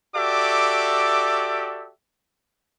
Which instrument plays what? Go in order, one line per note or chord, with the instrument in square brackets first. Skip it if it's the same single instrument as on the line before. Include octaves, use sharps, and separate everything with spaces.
[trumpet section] F#4 G4 A4 D5 E5 D6